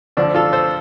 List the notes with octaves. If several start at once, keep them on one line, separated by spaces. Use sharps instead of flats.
D2 D3 F3 D4
F4 A4
A4 C5